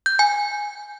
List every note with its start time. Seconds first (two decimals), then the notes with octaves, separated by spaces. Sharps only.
0.06 G6
0.19 G#5